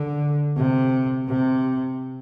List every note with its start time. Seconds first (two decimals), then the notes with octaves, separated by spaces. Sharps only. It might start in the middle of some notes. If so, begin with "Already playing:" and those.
Already playing: D3
0.56 C3
1.28 C3